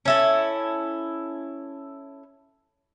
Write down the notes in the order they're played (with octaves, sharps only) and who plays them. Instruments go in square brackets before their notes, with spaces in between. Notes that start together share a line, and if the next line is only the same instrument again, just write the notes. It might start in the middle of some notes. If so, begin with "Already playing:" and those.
[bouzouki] C#4 E4 A4